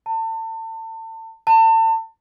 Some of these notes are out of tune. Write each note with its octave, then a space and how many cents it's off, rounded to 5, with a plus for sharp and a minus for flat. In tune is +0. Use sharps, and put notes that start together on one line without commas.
A5 +35
A5 +35